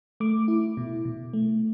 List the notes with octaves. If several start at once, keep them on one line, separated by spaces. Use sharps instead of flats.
A3 D6
E4
B2
B2
A3